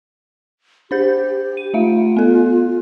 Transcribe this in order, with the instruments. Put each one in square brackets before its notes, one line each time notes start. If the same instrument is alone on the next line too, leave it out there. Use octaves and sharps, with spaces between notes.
[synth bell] D4 C5 G6 [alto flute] G4
[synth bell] D#7
[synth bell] A3 E5 F5 [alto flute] F4
[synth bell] B3 A4